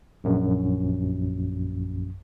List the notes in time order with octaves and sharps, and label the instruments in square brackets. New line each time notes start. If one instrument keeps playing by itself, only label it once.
[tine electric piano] A#1 F#2